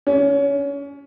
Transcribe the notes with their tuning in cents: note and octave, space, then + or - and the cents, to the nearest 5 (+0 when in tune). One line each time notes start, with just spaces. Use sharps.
C#4 +25